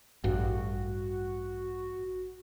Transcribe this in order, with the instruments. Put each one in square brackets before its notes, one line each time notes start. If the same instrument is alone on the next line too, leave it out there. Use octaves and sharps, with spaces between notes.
[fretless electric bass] A1 G2 [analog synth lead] F#4